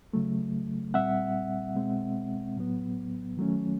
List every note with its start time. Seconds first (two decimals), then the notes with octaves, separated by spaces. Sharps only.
0.13 C#3 F#3 A3
0.94 A#2 G3 C4 E5 F#5
1.75 B2 G#3 C4
2.56 A2 F#3 B3
3.37 D#3 F#3 A3 C#4